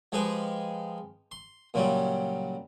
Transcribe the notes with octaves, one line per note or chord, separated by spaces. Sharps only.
F3 G#3 G4 G#4 B4
C6
A#2 C#3 F#3 G3